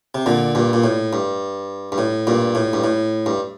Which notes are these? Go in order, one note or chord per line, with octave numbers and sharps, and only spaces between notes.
C3
A#2 D3
G2 A#2
A#2
A2
G2
G2
A2
G2 A#2
A2
G2
A2
G2